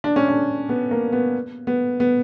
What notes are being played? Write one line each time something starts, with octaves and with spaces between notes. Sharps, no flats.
D4
C#4
D4
B3
A#3
B3
B3
B3